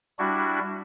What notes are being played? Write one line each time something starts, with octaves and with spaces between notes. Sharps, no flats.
G3 D4 E4 F#4